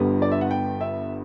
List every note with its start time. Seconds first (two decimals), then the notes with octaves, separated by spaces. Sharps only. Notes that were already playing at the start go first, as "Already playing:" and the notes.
Already playing: G1 G2 D3 G3 B3
0.22 D5
0.31 E5
0.41 F#5
0.51 G5
0.81 E5